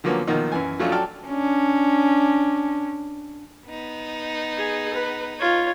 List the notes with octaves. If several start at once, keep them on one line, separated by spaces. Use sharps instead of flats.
D3 F3 F#3 A#3 B3 C#4
B2 D#3 F3 F#3 A#3
F#2 E3 G#5
F3 F#3 A3 C#4 D4 F4
F#3 A4 D5 G5 A5 F6
C#4 D4
B3 D#4
G#4
B4
F4 C#5